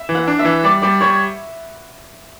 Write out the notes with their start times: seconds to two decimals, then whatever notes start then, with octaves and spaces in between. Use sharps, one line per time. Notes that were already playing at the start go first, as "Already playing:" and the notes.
Already playing: E5
0.09 E3
0.15 F#5
0.27 D4
0.39 E5
0.45 E3
0.64 G3 D5
0.82 G3 D5
1.01 G3 C#5